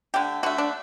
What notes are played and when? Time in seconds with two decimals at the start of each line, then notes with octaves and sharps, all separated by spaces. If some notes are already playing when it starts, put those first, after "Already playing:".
0.14 D3 A3 G4
0.43 D3 A3 F#4
0.58 D4